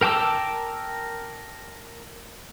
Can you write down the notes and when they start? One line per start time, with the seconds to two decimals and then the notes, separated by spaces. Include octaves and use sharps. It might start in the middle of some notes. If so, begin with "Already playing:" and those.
0.01 A#4 G5 A5 D6 E6